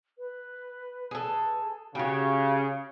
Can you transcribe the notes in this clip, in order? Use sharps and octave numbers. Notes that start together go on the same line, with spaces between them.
B4
G#4 A4
C#3 F#4 G4 C#5